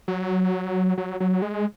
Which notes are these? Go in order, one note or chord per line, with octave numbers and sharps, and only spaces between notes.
F#3
F#3
F#3
G#3